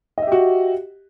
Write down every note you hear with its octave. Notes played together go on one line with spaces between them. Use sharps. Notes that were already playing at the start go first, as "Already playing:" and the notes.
F#4 G4 D#5 E5